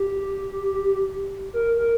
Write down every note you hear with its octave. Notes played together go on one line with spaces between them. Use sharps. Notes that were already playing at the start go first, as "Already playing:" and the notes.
Already playing: G4
A#4
A#4